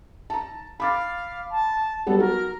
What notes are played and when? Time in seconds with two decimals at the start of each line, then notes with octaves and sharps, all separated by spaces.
0.30 A5 A#5
0.80 F5 B5 D6 A6
1.51 A5
2.07 F#3 G3 B3 A4
2.20 F#4 A#4